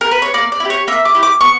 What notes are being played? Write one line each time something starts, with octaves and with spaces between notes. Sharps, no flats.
A#4
B4
C#5
A#3 D5
D5
E4
G4 C#5
A#3 E5
D6
E4 G4
D6
B3 C#6